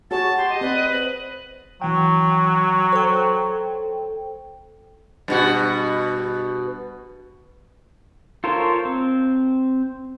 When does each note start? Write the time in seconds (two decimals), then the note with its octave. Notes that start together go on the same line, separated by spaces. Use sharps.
0.11 F#4 G#4 C#5 F#5 A5 A6
0.37 G4 C6
0.49 D#5
0.61 C4 B4 D5
0.92 C5 F#7
1.82 E3 F#3 G5
2.93 A4 C5 G5
5.28 G2 B2 F#4
8.44 F4 A4 A#4 C5 C#5
8.85 C4